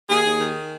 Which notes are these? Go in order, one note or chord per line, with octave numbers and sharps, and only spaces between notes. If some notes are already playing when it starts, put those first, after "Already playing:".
D#2 G#4
D#2
D#3